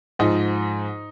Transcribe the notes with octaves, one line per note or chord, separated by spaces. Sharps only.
G#2 F3 D#4